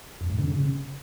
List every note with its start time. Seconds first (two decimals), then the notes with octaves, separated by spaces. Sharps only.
0.21 F2
0.30 G#2
0.39 D3
0.47 C#3